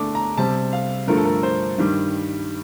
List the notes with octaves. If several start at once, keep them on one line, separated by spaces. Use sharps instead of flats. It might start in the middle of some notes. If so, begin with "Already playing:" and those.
Already playing: D3 A3 D4 D6
A#5
C3 G3 C4 A5
F5
G2 D3 F3 A3 A#4
A4
A#4
C5
G2 D#3 G3